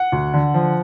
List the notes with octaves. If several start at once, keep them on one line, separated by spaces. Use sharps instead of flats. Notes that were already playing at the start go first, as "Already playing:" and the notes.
Already playing: F#5
D2
D3
F3